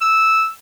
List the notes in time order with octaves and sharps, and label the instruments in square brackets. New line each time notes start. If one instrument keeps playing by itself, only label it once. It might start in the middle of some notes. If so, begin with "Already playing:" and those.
[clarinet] E6